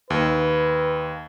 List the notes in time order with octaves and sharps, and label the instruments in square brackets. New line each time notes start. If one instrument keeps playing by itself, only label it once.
[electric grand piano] D#2 [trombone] B4